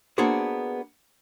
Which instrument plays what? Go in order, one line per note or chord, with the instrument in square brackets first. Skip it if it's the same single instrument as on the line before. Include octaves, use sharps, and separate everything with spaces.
[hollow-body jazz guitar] A#3 B3 D4 F#4 G#4 C5